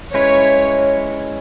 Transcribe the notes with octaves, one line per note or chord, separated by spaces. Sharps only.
G#3 C#4 E4 B4 C#5